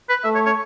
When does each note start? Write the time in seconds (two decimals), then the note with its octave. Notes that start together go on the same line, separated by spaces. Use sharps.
0.09 B4
0.24 A3 E5
0.35 C#5
0.46 C#5